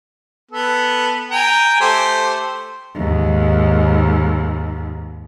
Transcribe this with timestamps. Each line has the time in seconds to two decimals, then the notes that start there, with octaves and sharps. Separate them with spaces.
0.51 B3 A4
1.31 G5 G#5 A#5
1.81 A3 G4 C5
2.95 D#2 G#2